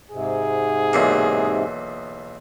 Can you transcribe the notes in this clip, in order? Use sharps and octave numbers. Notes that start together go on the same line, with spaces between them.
G#2 C3 G#4
B1 E2 A#3